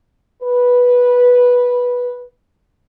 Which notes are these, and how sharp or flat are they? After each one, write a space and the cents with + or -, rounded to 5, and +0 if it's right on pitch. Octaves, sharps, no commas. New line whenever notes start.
B4 -10